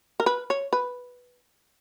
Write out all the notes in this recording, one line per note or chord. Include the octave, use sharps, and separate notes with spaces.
A#4
B4
C#5
B4